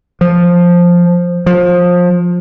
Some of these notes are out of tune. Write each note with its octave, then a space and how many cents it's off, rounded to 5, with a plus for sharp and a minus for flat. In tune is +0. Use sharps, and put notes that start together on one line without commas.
F3 +5
F3 +25